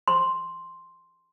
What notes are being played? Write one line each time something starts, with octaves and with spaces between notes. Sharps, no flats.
C6